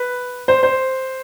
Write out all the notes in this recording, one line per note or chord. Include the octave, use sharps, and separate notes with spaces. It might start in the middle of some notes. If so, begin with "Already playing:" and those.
Already playing: B4
C5
C5